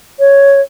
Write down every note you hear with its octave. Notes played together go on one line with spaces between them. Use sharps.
C#5